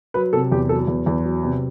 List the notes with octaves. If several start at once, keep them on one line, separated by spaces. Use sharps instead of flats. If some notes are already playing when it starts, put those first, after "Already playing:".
F#3 B4
C3 A4
E2 G4
F#3 A4
E2
E2
F#3
C3